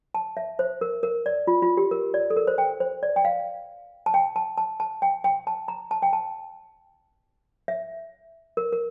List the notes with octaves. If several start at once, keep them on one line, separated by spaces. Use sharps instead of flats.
A5
E5
C5
A#4
A#4
D5
F4
F4
G4
A#4
D5
A4
A#4
C5
G5
C5
D5
G5
F5
A5
G5
A5
A5
A5
G5
G5
A5
A#5
A5
G5
A5
E5
A#4
A#4